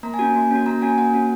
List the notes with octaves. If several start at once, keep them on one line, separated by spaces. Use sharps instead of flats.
A#3 A#5
G#5
C#4 F#4
A#3
C#4 F#4
A#3 A#5
C#4 F#4 G#5
A#3 F#5
C#4 F#4